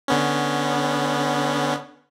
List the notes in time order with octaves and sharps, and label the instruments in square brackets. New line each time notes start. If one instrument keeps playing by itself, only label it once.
[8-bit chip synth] D3 B3 C#4